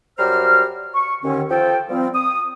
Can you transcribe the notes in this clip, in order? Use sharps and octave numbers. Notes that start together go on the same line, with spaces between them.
F#2 G3 C5 A#5 F6
C#6
D#2 D3 D#3 C#4
F3 A4 G5
F3 G3 C4
D#6